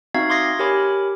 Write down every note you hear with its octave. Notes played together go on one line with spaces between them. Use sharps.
C4 D#4 F#4 E5 F5 G#6
C6 D6 D#6 G#6 A#6 C7
G4 A#4 C#5 G#5 B5 D6